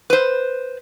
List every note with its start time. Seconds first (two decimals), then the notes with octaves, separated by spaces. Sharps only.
0.10 B4 C5